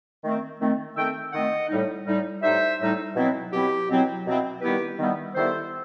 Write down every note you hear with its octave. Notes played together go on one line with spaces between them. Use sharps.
D#3 A3 C4
D#3 A3 C4
D#3 A3 C4 E5 G5
D#3 A3 C4 D#5 F#5
A2 G3 D#4
A2 G3 D#4
A2 G3 D#4 C5 E5
A2 G3 D#4
B2 F#3 C4 E4
B2 F#3 C4 E4 G4
B2 F#3 C4 E4
B2 F#3 C4 E4
D#3 G3 B3 E4 G4 B4
D#3 G3 B3 E4
D#3 G3 B3 E4 A4 C5